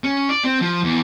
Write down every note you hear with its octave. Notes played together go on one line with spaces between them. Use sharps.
C#4
D5
C4
F3
E2